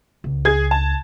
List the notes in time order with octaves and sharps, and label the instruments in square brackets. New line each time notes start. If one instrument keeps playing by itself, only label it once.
[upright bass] C#2
[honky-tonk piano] G#4 G#6
A5